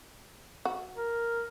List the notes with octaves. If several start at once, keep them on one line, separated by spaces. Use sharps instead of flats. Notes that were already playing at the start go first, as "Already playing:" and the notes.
F#4
A#4